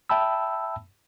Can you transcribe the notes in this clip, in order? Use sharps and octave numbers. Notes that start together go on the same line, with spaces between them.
E5 G5 A5 B5 E6